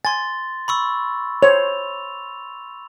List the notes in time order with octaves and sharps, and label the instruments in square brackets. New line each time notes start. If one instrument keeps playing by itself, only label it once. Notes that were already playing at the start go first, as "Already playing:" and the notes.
[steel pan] G#5 [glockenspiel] C6 A6
[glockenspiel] B5 C#6 E6
[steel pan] C5 C#5 [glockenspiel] F7